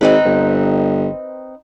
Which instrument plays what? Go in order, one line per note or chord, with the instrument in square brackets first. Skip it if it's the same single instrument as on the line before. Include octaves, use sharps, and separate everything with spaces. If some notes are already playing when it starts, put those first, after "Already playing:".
[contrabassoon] G#1 [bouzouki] C4 D#4 B4
[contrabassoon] G1